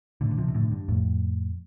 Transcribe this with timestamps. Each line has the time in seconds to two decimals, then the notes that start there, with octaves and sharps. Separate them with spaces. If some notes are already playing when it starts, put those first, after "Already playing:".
0.21 A2 D3
0.31 D3
0.38 C3 F3
0.48 C3
0.54 A2 D3
0.72 G2
0.88 F2 A2